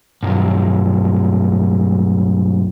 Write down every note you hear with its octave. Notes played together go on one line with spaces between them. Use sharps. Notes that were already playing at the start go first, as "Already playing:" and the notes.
B1 G2